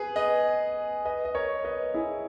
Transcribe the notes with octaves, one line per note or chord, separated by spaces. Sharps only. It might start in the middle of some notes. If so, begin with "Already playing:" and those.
Already playing: G#4 B4
B4 D#5
B4 D#5
D#5
A#4 C#5
B4 D#5
E4 G#4